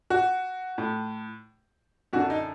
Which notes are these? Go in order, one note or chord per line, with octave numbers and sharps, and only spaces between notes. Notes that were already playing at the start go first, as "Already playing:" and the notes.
F#4
A2
F#2 D3 F#4
D#4